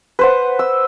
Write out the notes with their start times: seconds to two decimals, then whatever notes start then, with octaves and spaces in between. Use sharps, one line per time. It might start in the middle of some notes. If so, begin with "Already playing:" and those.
0.19 B4 C5 F#5
0.59 E6